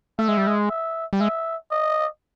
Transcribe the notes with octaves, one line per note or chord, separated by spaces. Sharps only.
A3 E5
G#3
G3
G#3
E5
G3
G#3 E5
D#5